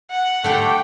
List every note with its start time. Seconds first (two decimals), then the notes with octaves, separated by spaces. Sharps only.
0.10 F#5
0.44 D3 A3 G4 G5